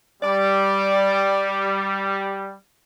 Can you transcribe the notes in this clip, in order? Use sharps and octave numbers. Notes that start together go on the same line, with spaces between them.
G3 D5